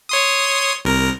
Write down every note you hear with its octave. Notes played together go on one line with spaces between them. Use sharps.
C#5 C6 D#6
C2 A#4